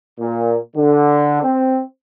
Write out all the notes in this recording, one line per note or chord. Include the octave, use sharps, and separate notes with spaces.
A#2
D3
C4